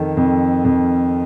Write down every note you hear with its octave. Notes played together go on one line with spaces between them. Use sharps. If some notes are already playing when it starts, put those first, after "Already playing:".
Already playing: F2 D#3 A4
F2
F2